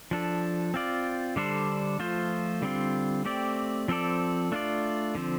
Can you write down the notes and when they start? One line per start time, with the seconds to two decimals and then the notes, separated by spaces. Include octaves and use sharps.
0.11 F3 D4 A4
0.74 C4 F4 D5
1.36 D3 G3 D4 A4 C5
1.99 F3 A3 F4 C5
2.62 D3 G3 C4 F4
3.25 A3 C4 G4 D5
3.88 F3 C4 A4 D5
4.52 A3 D4 F4 D5
5.15 D3 F3 C4